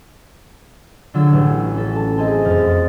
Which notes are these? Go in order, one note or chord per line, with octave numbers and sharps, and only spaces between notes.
D3 F#3 F4 E6
A1 E3 F#3
C#4 A4
A5
C4 G#4 D#5 A5
F#1 F2 F6 A6